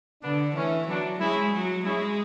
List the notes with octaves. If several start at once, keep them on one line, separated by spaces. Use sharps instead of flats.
D3 B3 D4
E3 A3 C#4
F#3 B3 D4
G#3 C#4 E4
F#3
G#3 C#4 E4